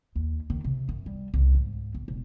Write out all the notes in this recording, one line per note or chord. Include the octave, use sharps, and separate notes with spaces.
D#2
D#3
C3
F#2
G3
C2
G#2
G1
E1